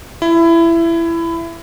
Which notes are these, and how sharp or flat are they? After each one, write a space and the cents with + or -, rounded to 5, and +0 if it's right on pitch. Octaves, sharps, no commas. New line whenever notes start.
E4 +20